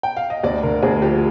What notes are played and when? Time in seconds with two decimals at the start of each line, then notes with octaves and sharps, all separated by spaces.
0.03 G5
0.17 F5
0.30 D#5
0.43 D2 D5
0.63 D3 A#4
0.82 D2 G#4
1.02 F3 G4